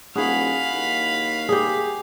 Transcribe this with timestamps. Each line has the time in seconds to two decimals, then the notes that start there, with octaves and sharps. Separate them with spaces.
0.16 D#1 E4 F#4 G#4 F5 B5
0.73 D#2
1.49 G4 G#4